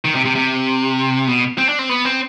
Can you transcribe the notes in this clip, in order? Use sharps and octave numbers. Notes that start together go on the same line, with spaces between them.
D#3
C3
C3
C3
B2
C4
D4
C4
B3
C4